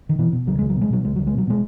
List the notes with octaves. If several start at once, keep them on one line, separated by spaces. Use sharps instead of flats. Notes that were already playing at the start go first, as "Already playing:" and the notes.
D#3
B2 E3
B2
C#2 F#3
C#2 G#3
F#3
B2
G#3
B2 F#3
C#2 G#3
C#2 F#3
G#3
B2 F#3
B2 G#3